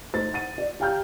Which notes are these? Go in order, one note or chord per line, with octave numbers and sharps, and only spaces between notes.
A3 D#4 C5 A6
F#5 A6 D#7
D5
G4 F5 G5 A#5 F6 G6